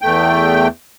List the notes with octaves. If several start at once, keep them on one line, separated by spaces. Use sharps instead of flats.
E2 A3 G5